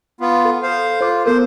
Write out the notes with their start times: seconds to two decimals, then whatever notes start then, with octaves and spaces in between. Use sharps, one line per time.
0.21 B3 F4
0.45 A4
0.63 C5 F5
1.01 F4 C5 D6
1.26 B3 A4 A#4 C5